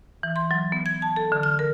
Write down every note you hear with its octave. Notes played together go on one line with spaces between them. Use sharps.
E3
C6
F#3
B3
G#6
A5
A4
D3
F6
A#4